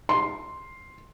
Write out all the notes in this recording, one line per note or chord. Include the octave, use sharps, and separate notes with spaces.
C6